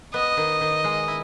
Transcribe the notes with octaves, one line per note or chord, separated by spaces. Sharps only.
B3 D#5
D#3
D#3
G#3
E4